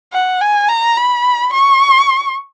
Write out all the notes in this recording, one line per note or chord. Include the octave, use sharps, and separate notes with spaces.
F#5
G#5
A#5
B5
C#6